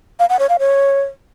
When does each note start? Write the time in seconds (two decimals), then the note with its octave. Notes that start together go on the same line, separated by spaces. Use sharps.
0.19 F5
0.29 F#5
0.39 C#5
0.49 F5
0.59 C#5